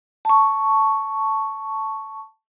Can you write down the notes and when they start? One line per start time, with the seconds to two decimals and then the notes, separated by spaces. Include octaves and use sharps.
0.25 A5 C#6